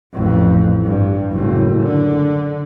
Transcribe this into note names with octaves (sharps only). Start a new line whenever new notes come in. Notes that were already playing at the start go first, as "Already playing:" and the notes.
A1 F2
G2
F#1 A2
D3